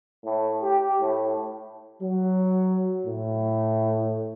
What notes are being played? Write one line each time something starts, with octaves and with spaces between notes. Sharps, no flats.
A2
G4
A2
F#3
A2